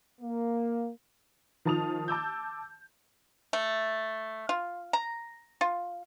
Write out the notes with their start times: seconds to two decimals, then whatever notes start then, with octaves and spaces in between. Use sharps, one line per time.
0.21 A#3
1.65 D#3 F3 A5 D#6 F7
2.08 A5 D6 E6 G6
3.53 A3
4.49 F4
4.93 A#5
5.61 F4